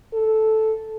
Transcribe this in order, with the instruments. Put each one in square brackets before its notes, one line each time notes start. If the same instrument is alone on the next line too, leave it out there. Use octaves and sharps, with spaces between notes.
[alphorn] A4